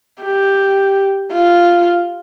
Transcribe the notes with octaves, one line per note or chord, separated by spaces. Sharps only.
G4
F4